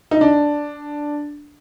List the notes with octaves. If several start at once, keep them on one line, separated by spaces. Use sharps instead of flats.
D#4
D4